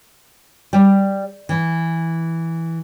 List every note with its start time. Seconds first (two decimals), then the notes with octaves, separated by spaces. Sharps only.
0.73 G3
1.49 E3